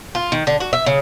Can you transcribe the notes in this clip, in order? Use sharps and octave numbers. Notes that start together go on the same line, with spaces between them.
F4
D#3
D3
F#4
E5
C#3